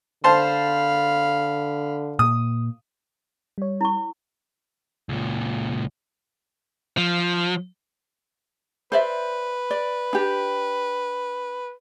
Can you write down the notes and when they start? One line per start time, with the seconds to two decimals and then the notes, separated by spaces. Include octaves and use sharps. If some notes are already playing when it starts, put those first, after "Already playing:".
0.24 D3 C5 F5 A5 B5 C6
2.19 A#2 D#6
3.58 G3 C#5
3.81 E4 C#6
5.09 C#2 A#2
6.98 F3
8.92 B4 C5 D5 E5
9.71 D5
10.13 D4 G4